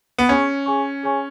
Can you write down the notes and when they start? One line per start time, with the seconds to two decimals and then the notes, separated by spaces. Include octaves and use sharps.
0.18 B3
0.29 C#4 G#4 C#5 G#5 C#6
0.66 G#4 C#5 G#5 C#6
1.03 G#4 C#5 G#5 C#6